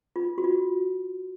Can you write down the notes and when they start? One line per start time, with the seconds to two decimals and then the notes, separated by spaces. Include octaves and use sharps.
0.16 F4
0.38 F#4
0.44 F4